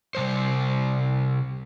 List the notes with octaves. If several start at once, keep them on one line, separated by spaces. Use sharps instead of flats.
C3 G3 C5